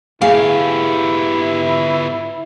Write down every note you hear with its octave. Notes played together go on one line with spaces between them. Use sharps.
A3 B3 E4 G4 G#4 F5